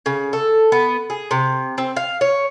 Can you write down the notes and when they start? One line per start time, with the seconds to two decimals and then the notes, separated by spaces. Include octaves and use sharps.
0.06 C#3
0.33 A4
0.72 B3
1.10 G#4
1.31 C3
1.78 C4
1.96 F5
2.21 C#5